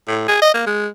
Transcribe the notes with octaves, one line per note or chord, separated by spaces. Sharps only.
A2
G#4
D#5
A#3
G#3